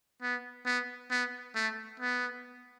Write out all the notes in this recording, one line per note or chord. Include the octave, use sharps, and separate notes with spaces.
B3
B3
B3
A3
B3